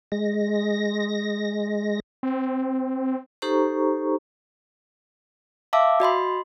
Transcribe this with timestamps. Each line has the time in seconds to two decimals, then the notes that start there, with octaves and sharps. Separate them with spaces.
0.12 G#3 A#6
2.23 C4
3.42 D#4 G4 A4 C5 A#5 C#6
5.73 E5 F5 A5 D6 E6
6.00 F#4 D#5 B5 C6